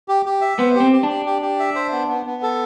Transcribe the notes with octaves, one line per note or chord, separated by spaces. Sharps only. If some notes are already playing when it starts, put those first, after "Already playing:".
G4
G4
E5
B3 C5
G4
C4
G4
D4
G4
G4
G4
E5
C5
B3
B3
B3
A4